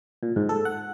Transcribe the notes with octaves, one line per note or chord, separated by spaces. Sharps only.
A#2
G#2
A4
F#5